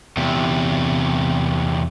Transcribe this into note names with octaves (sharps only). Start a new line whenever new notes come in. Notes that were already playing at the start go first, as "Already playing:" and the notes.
E2 C3